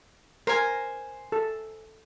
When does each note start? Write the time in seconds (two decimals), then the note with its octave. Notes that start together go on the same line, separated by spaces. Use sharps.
0.47 A#4 C5 G#5
1.32 A4